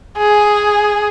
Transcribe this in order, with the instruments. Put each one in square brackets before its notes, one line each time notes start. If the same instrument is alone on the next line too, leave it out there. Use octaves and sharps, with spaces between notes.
[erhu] G#4